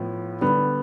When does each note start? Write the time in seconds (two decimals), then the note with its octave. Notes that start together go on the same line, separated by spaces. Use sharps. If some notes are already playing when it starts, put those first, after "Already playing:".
Already playing: A2 F3 B3
0.41 D3 G3 B3